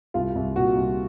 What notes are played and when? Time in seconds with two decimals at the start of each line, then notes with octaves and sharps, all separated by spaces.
0.14 C2 F4
0.35 C2
0.56 A#2 F#4
0.77 C2